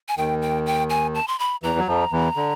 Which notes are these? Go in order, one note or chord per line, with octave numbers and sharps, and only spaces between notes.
G#5
D#2 D#3 G5
G5
G5
G#5
A5
C6
B5
E2 E3 A#5
F#3
F2 F3
E2 E3
D3